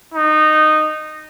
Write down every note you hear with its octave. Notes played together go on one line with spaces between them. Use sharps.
D#4